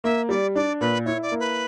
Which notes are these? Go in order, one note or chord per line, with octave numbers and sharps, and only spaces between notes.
A#3 E5
G3 D5
D4 D5
A#2 B4
E4 C#5
D5
A#3
B4